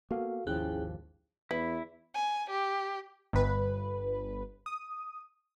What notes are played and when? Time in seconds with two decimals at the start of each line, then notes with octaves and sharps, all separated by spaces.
0.11 A#3 B3 F#4 A4 F5
0.47 G#1 D#2 F3 C#4 E4 G#4 G5 F#6
1.51 E2 E4 B4
2.14 G#5
2.50 G4
3.33 G1 B4
4.66 D#6